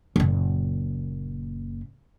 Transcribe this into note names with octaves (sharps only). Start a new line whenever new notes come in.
F#1 A#2